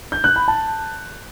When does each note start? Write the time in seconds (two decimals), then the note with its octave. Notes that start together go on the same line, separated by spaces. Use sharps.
0.12 G6
0.24 F#6
0.36 B5
0.48 A5